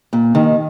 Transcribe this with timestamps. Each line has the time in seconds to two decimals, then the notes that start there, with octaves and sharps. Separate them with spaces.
0.13 A#2
0.35 D#2 D#3